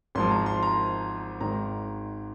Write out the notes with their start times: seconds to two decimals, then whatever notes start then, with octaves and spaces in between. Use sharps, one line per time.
0.15 G#1 G#2 F3 C6
0.31 A#5
0.46 C6
0.63 A#5
1.40 G#1 G#2 D#3 A#5